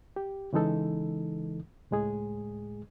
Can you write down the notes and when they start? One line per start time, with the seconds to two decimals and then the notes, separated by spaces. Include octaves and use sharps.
0.16 G4
0.53 C#3 E3 G#3 D#4 A4
1.91 C#2 A2 G#3 G#4